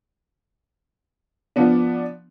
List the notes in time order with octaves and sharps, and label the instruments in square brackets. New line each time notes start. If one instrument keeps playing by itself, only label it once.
[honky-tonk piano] F3 B3 D4